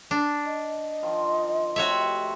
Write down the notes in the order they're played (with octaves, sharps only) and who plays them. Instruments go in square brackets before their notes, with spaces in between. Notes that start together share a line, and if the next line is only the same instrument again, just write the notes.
[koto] D4
[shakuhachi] D#5
[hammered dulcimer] D#3 F3 F4
[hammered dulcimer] C3 A3 [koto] F#4 C#5 E5